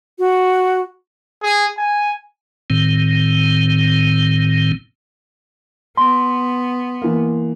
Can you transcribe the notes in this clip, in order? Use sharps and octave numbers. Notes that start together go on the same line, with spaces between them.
F#4
G#4
G#5
A2 D#3 C4
B3 C6
E3 A#3